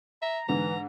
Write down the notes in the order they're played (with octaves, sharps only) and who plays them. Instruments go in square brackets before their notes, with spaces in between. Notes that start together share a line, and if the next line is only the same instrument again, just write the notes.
[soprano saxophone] E5 [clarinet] A#5
[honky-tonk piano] G#2 D3 [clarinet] E3 [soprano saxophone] A#5